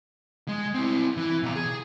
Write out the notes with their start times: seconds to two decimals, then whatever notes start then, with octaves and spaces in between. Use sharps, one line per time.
0.48 G#3
0.75 C4 E4
1.17 E3
1.43 B2 A#5
1.56 G#4